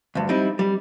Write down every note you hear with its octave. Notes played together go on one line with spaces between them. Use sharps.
D2 G2
G3 C4 D#4 E4
G3